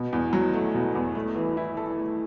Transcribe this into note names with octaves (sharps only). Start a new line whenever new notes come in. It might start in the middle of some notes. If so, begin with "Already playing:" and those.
Already playing: B2
E2
F#3
A3
B2
E2
A3
E3
E4
A4
A3